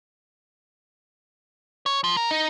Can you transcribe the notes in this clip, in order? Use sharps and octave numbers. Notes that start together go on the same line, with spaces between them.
C#5
F3
A#4
D#4